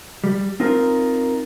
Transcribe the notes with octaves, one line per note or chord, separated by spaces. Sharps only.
G3
C4 D#4 F4 A#4